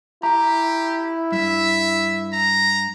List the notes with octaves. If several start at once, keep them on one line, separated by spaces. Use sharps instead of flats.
E4 G4 A#5
G2 E5
A#5